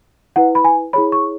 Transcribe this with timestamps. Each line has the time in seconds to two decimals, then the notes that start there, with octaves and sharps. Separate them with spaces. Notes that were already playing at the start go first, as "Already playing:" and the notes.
0.36 E4 B4 F#5
0.55 B5
0.64 G#5
0.93 E4 G#4 C#5 B5
1.12 C#6